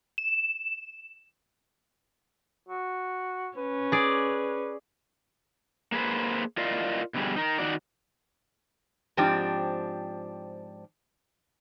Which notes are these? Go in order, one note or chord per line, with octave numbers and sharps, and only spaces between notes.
E7
F#4
C#4 B4
G#4 D5
A#3 G#4 B4 C5
E4 F4 A#4 D5 D#5 F5
B2 D3 G3 G#4
D#4 A#4
D#3 D#4 F#4 D5
G#2 F3 C4 D4 G4